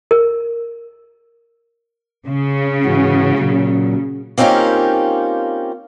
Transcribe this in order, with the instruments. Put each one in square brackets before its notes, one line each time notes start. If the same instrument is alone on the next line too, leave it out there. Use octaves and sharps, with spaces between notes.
[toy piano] A#4
[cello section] C#3
[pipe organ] G#2 E3 F#4
A#2 F#3
[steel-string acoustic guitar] A#3 C4 C#4 D#4 F4 G4